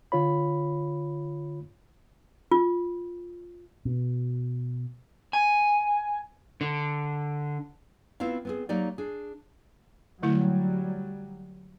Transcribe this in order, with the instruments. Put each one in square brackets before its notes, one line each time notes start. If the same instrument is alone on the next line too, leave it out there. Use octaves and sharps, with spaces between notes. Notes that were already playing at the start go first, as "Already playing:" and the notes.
[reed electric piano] D3 F4 C#5 B5
[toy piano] F4
[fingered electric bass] B2
[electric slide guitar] G#5
D3
[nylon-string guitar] B3 C4 E4 F4 F5
B3 C4 G#4
F#3 A#3 D#4 G4 D5
D4 G#4
[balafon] D3 A3 E4 [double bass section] F#3 G3